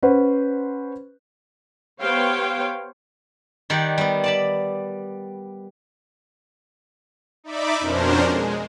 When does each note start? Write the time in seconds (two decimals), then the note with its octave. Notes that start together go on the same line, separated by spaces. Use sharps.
0.03 C#4 B4 C5 F#5
1.99 B3 G4 C5 C#5 F5 G5
3.70 D#3 G3 G4 D5 F#5
3.98 G3 B3
4.24 D5 A5 B5
7.44 D#4 D5 E5 B5 D6
7.80 F2 B2 C#4 D4 A#4 C5
8.25 G#3